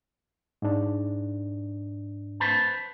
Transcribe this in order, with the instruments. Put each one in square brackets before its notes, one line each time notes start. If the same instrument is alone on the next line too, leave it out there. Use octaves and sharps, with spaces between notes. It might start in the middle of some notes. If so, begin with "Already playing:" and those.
[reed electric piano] G#2 D4
[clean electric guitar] B4 C5 A5